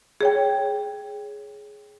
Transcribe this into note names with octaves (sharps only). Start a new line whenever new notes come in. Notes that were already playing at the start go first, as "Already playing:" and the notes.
G#4 C#5 G5